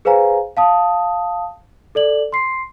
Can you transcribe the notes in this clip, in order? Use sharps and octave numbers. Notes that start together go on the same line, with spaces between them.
G#4 B4 C5 F5 G#5 A#5
F5 A5 D#6
A4 D5 F#7
C6 C7